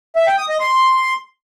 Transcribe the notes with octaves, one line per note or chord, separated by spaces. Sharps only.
E5
G5
D#6
D#5
C6